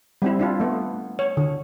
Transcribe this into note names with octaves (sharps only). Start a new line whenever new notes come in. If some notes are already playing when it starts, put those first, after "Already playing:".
G3 C4 E4
D4 E4 F4
A3 B3
C#5
D3